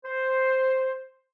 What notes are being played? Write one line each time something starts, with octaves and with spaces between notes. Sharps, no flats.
C5